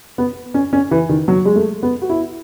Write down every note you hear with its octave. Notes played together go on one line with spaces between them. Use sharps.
B3
C#4
C#4
E3
D#3
F#3
G#3
A3
B3
F#4
E4